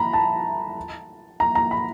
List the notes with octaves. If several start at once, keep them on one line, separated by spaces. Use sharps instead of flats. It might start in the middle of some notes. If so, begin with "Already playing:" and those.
Already playing: A#5 B5
A5
A#5
A#5
B5